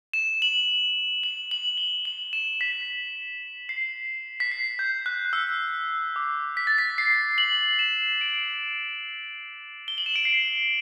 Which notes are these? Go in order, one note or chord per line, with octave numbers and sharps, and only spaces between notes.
E7
F#7
F#7
F#7
G7
F#7
E7
B6
C7
B6
C7
G6
F#6
E6
D6
B6
A6
B6
C7
F#7
E7
D7
G7
F#7
E7
D7
C7